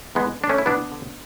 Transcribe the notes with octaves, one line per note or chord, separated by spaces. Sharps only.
E2 G#3 B3
D3 D4
A3 C#4
E4
E2 B3 D4
D3